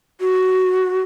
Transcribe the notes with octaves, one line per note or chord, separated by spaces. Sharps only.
F#4